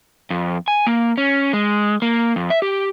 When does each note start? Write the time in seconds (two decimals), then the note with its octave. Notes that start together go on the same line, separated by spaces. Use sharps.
0.30 F2
0.68 G#5
0.87 A#3
1.18 C#4
1.53 G#3
2.02 A#3
2.36 F2
2.50 E5
2.62 G4